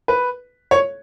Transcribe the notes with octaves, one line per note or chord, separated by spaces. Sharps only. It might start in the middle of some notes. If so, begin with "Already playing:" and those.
B4
C#5